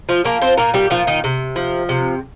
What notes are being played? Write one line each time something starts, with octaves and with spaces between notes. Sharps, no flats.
F3 F4
F3 A#3 A#4
C4 C5
A#2 A#3 A#4
G3 G4
A#2 F3 F4
D#3 D#4
C3
F3
C3